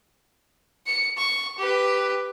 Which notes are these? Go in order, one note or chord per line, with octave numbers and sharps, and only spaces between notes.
C#7
C#6
G4 B4